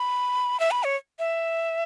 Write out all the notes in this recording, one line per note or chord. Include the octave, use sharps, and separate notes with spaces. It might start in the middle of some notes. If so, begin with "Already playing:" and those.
Already playing: B5
E5
B5
C#5
E5